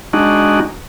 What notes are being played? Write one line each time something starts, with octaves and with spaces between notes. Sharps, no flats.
G#3 D4 D#4 F#4